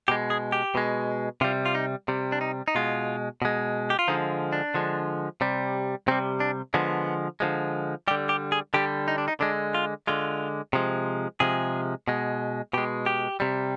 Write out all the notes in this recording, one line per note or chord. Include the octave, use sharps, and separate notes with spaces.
B2 G#3 G4
G#4
G4
B2 G#3
C3 G3 F4
F4
D#4
C3 G3
D4
D#4
D#4
B2 G#3 F4
B2 G#3
G4
F4
D3 F3 G#3 D#4
D4
D3 F3 G#3
C3 G3
C3 G3 C4
D4
D3 F3 G#3 B3
D3 F3 G#3
D3 G3 G4
G4
G#4
D3 G3 G4
D#4
D4
D#4
D3 G#3 D4
F4
D3 G#3 F4
C3 F3 G#3
C3 F3 G#3 G#4
B2 G#3
B2 G#3 G4
G4
C3 G3